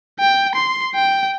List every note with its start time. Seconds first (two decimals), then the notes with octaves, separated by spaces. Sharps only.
0.20 G5
0.55 C6
0.95 G5